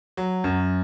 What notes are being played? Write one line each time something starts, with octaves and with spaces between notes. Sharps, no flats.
F#3
F#2